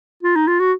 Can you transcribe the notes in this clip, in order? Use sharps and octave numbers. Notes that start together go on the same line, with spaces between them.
F4
D#4
F4
F#4